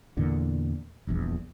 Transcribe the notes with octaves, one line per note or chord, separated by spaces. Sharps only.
E2 A#2 D3
D#1 A#1 E2